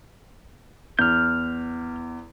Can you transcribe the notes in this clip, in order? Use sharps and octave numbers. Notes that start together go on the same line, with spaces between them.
E2 F6 G6